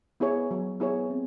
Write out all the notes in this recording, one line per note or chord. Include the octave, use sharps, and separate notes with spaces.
B3 E4 G#4 C#5
F#3
B3 E4 G#4 C#5
C4